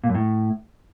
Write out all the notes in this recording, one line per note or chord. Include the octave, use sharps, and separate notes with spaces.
A#2
F#2
A2